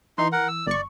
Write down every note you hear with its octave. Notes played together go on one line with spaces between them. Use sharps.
E3 D#4 C6
A#4 F#5
E6
G1 D5 C#6